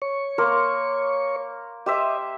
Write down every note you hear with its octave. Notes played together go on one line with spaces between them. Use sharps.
C#5 C#6
A#3 A#4 C6
G4 C5 D#5 E5